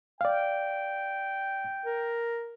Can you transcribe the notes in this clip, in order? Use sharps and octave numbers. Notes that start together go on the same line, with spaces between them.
D5 F5 G5
A#4